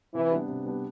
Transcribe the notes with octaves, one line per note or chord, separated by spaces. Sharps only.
C3 E3
G3 B3 D4 G4
C3
G3 B3 D4 G4